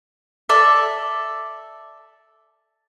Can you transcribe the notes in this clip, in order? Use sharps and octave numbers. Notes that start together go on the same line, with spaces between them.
A4 D5 E5